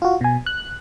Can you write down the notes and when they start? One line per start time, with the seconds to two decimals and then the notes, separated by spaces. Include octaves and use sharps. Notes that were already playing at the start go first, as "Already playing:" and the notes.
0.02 F4 F#4
0.21 B2 G#5
0.46 F#6